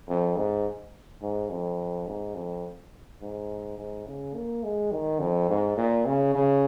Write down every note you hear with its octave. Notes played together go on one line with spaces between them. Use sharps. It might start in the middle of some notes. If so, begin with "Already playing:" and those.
F2
G#2
G#2
F2
G#2
F2
G#2
G#2
C#3
A#3
G#3
D#3
F2
G#2
A#2
C#3
C#3